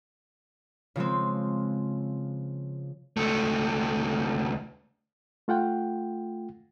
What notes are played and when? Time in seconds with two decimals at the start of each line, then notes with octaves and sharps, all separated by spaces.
0.96 C#3 F3 G#3 C4
3.17 C#2 A3
5.48 A3 F4 F#5 G5